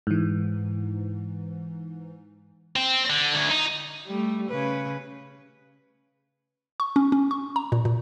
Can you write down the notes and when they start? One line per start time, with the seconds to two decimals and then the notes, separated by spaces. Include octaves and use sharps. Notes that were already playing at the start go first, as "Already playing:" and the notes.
0.07 G#2 E3
2.76 C4
3.10 D3
3.35 D2
3.50 D#4
4.06 G3 A3
4.49 C#3 B4
6.80 C#6
6.96 C#4
7.12 C#4
7.31 C#6
7.56 A#5
7.72 A#2
7.85 A#2